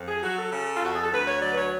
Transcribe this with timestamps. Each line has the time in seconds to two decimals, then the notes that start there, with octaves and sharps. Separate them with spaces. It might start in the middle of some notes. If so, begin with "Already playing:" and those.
Already playing: F2
0.08 G#4
0.23 F#3 F#4
0.37 A4
0.53 C#3
0.74 F4
0.82 F2 F#4
0.93 G#4
1.02 A4
1.12 D2 B4
1.27 C#5
1.42 F#3 D5
1.50 B4
1.57 C#5